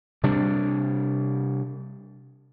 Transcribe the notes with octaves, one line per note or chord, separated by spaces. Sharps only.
C3 G3 D4